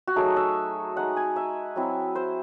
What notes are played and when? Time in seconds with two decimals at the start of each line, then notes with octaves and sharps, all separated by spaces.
0.07 F#4
0.16 F#3 A3 D#4 G#4
0.36 E5
0.96 G#3 D#4 F#5
1.17 G#5
1.36 E5
1.76 F#3 C4 E4
2.15 C5